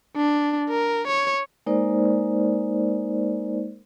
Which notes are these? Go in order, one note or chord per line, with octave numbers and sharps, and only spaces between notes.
D4
A#4
C#5
G#3 A#3 D#4 A#4 C5 D5